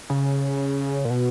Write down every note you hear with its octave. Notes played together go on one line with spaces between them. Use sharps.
C#3
A#2
B2